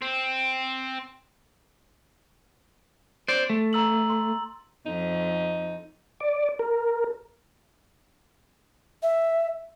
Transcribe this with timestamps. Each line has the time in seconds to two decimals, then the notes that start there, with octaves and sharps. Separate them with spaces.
0.02 C4
3.28 C5 D5 A6
3.50 A3
3.73 A#5 E6 F#7
4.10 C6
4.86 F2 D#4
6.20 D5
6.59 A#4
9.03 E5